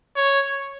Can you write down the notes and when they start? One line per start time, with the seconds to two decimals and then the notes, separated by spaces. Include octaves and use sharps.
0.16 C#5